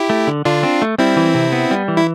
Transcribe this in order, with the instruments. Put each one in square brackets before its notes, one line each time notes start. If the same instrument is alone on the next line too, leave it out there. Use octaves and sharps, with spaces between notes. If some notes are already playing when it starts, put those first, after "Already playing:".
Already playing: [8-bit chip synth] E4 G4
[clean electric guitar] A3
D3
[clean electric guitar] D3 [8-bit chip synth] D4 F4
[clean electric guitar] C4
A3
[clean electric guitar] G3 [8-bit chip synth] C4 E4
[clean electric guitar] E3
C3
B3
G3
E3
[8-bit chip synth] E4